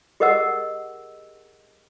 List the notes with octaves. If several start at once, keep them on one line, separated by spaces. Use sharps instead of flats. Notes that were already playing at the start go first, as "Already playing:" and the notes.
G4 G#4 A#4 D#5 F#5 E6